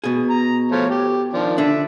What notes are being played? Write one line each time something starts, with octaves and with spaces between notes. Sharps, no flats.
B2 G#4
A#5
F3 A3 C#5
G4
D#3 F3 D4
D3 D4 E5